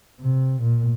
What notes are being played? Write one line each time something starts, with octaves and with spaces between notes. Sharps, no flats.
C3
A#2